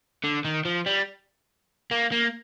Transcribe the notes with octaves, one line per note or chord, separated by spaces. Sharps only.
D3
D#3
F3
G3
A#3
A#3